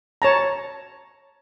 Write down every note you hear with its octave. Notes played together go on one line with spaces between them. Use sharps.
C#5 A5 A#5